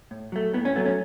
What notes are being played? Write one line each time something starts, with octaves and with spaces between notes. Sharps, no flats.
A2
F#3 A3
A2 B3
C#4
F#3 A3 B3
C#4